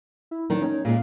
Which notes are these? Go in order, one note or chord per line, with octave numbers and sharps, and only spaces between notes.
E4
D#3 F#3 D4
C#4 D#4
A#2 G#3 F5